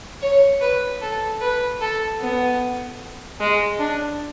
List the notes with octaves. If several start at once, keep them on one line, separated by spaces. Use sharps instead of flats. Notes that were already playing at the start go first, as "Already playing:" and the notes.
C#5
B4
A4
B4
A4
B3
G#3
D4